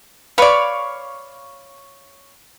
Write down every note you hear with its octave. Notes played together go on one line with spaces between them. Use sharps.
B4 C#5 D5 F5 B5